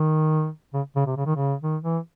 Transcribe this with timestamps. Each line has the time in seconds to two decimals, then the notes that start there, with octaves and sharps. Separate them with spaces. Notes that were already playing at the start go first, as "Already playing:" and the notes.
Already playing: D#3
0.73 C#3
0.96 C#3
1.06 C3
1.17 C#3
1.26 D#3
1.36 C#3
1.61 D#3
1.83 E3